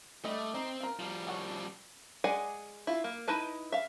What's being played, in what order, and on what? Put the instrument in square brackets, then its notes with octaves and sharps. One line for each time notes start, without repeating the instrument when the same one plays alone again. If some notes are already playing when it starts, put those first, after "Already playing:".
[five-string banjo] G3 D4 D#5 [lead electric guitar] A3
[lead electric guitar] C4 [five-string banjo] D#4
[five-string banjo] F4 A#4
[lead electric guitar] F3 G3
[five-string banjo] C#5 F#5 G#5
G#3 G#4 D5 F#5 G#5
E4 F4
A#3
D#4 E4 B4 A5
E5 F5